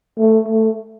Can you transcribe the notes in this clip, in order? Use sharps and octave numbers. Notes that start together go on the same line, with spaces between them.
A3
A3